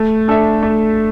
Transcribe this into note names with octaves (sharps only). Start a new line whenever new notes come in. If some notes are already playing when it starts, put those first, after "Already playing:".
Already playing: A3
D4 A4 E5
A3